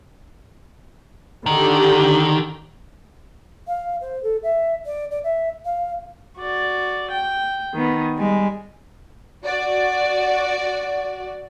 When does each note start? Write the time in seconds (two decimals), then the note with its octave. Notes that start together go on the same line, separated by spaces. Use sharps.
1.46 D3 D#3 G4
3.68 F5
4.01 C5
4.23 A4
4.43 E5
4.86 D5
5.11 D5
5.24 E5
5.65 F5
6.39 F#4 D5
7.11 G5
7.75 D#3 B3
8.17 G3 G#3
9.45 F#4 D5